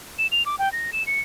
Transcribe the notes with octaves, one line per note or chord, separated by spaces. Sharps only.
E7
F7
D6
G5
A#6
E7
C#7